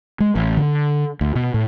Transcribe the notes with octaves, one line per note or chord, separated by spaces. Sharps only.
G#3
A1
D3
D2
B2
A2